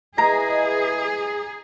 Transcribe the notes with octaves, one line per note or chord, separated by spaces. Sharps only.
E4 G#4 B4 D#5 A#5